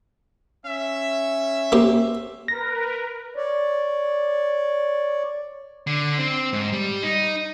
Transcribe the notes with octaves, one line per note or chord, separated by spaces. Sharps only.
C#4 E5
A#3 C4 G4
A#4 B4 A#6
C#5 D5
D3
C4
G#2
G3
D#4